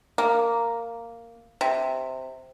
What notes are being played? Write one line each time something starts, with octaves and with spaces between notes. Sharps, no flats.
A#3
C3